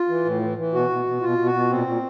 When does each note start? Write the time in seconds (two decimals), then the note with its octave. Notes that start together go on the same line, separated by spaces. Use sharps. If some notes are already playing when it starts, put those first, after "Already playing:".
Already playing: F4
0.09 E3
0.25 A2
0.42 E3
0.57 E3
0.73 B2 F#4
0.90 B2
1.06 B2
1.22 B2 F4
1.38 B2
1.46 F#4
1.54 B2
1.70 A#2 C4
1.86 A#2